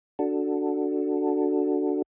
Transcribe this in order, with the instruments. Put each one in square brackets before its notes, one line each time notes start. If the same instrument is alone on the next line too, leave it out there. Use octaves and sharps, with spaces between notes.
[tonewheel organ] D4 F#4 A4